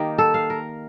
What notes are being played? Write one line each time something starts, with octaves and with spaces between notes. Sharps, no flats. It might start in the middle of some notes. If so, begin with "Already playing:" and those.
Already playing: D#3 A#3 D#4 G4
A4
F5
A#4